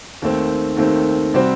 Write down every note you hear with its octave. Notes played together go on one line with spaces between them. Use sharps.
D#2 D#3 A3 C4
D#2 D#3 A3 C4
C3 G3 C4 F#4 C5